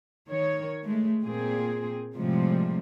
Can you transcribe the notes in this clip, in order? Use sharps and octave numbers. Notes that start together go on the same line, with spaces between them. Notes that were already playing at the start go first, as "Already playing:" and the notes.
D#3 C#5
G#3 A3
A#2 C4 G#4
A2 C3 F3 G3 G#3